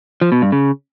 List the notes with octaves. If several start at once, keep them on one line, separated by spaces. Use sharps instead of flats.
F3
B2
G2
C#3